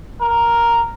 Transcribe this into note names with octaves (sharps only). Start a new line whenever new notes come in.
A#4